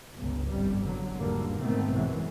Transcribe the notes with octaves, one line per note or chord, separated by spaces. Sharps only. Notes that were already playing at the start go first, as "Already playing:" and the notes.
G1 C#2
G1 F2 G3
D3 F#3
E2 G#2 D3 G3 A#3
G#2 B2 D#3 A3 B3 C4
B1 F#2 E3 G#3